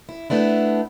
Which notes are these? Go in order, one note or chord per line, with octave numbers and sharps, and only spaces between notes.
E4
A3 B3 D4 E4